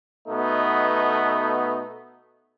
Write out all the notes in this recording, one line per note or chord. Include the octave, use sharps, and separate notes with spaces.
B2 A3 B3 D#4